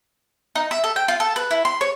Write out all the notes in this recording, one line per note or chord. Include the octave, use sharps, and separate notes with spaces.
D#4
E5
A4
G5
F4
A4
B4
E4
C6
C#5